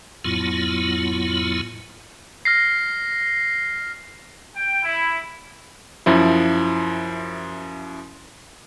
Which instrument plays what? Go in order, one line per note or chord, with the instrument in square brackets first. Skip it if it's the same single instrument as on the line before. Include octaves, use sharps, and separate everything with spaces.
[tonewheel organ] F2 A2 F#3 B3 E4 F4
[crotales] F6 A#6 C7
[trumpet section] G5
E4
[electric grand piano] F#2 F3 E4